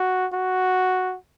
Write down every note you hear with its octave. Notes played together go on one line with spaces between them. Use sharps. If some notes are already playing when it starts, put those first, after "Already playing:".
Already playing: F#4
F#4